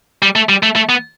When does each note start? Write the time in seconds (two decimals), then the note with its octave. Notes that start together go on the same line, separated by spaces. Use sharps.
0.22 G3
0.36 A3
0.49 G3
0.63 A3
0.76 A3
0.89 B3